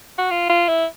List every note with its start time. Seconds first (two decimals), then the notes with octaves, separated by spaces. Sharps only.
0.18 F#4
0.31 F4
0.49 F4
0.68 E4